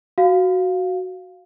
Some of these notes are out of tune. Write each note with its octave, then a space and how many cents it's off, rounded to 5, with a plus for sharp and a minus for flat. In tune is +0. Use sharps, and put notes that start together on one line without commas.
F#4 +0 F5 +5